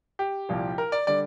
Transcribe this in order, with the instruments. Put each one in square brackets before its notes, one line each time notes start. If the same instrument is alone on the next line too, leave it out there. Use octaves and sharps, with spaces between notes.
[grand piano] G4
C2 A#2 F3
A#4
D5
D3 G3 D5